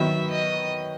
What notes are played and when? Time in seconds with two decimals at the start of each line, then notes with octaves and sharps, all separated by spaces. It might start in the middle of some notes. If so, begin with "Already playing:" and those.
Already playing: D#3 F#3 B3 E5
0.31 D#5